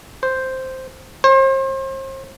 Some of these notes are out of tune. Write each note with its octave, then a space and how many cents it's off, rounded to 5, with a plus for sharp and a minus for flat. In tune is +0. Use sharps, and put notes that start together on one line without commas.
C5 +0
C5 +40